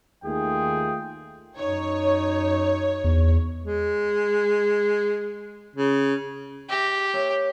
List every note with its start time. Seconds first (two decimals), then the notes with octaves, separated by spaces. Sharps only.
0.24 D#2 D#3 A3 F4 G#4 G5
1.57 F#2 D#4 C#5
3.04 E2
3.64 G#3
5.76 C#3
6.70 G4 E5 D6 A#6
7.13 A#3 C#5 E5